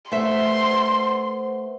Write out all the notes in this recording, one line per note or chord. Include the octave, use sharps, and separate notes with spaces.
A3 B4 C5 E5 F#5 C6